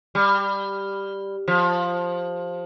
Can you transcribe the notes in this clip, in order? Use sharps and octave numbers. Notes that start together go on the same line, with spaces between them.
G3
F3